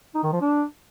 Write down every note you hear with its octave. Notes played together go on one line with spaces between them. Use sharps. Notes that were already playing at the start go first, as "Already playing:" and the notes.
D#4
D#3
F3
D4